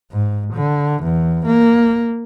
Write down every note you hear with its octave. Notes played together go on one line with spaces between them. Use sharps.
G#2
D3
E2
A#3